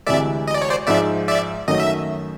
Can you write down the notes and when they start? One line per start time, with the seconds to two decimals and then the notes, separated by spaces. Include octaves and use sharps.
0.07 D2 C3 E3 G#3 D5 E5
0.47 D#5
0.54 D5
0.62 C#5
0.70 C5 D5
0.87 G#2 F3 G#3 D5 E5
1.28 D5 E5
1.68 F#2 D#3 F#3 A3 D#5
1.80 E5